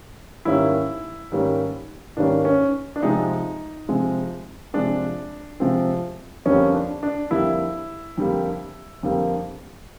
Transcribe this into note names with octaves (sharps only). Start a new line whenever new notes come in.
G#2 D#3 G3 A#3 C#4 E4
G#2 D#3 G3 A#3 C#4
G#2 D#3 G3 A#3 C#4 D4
C#4
D4
C3 F3 G#3 C4 D#4
C3 F3 G#3 C4
C3 F3 G#3 C4 D4
C3 F3 G#3 C4
F2 D3 G3 A#3 C#4
D4
D4
F2 D3 G3 A#3 E4
F2 D3 G3 A#3
F2 D3 G3 A#3